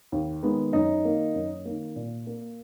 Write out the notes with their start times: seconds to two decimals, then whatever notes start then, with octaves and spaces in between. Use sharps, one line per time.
0.12 D#2
0.43 D#3 G#3 B3
0.73 F#2 D#4
1.04 D#3 A#3
1.35 F#2
1.65 D#3 A#3
1.96 A#2
2.27 A#3